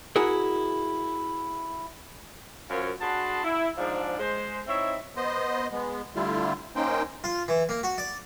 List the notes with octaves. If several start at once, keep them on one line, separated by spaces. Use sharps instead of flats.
E4 F#4 G#4 A#4
F#2 F4 A#4 C5 C#5 F5
D4 F#4 G#4 A5 B5 C6
E4
G#2 F3 D4
G#3 C5
C4 D#4 E4 C#5 E5
B3 C5 D#5
G#3 B3
D3 G3 A3 E4 F4
A#3 C#4 D#4 C5 G5
F4
E3
A#3
F#4
D5